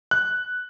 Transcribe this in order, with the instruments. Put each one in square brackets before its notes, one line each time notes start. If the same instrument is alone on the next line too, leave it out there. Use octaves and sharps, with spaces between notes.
[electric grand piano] F#6